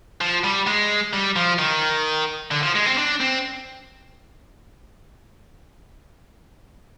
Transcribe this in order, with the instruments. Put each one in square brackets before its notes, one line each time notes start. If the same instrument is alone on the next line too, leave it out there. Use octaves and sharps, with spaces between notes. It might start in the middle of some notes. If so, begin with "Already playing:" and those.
[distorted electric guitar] F3
G3
G#3
G3
F3
D#3
D3
F3
G#3
C4
D4
C4